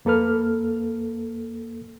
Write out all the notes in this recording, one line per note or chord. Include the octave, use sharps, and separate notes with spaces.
F2 A#3 A4 B4 F6